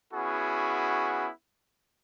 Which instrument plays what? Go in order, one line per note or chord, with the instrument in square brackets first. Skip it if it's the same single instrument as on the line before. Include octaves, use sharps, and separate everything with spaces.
[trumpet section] B3 C#4 E4 F#4 G#4